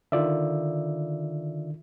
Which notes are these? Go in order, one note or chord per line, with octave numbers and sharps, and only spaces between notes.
D3 D#3 F4 D5 E5